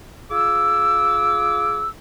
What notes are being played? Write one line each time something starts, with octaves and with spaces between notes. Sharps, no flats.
F4 G#4 D6 E6